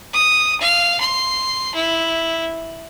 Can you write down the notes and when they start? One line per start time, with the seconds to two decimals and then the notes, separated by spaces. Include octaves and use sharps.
0.13 D#6
0.61 F5
1.00 C6
1.75 E4